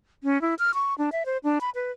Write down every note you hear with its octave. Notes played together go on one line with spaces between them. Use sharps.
C#4
E4
F6
C#6
D4
E5
C5
D4
B5
B4